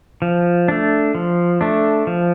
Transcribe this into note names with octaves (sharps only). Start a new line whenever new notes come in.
F3
A3 D4
F3
A3 D4
F3